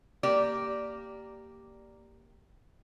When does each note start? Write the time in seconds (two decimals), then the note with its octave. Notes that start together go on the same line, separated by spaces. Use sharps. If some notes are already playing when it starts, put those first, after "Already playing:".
0.23 A#3 G4 D5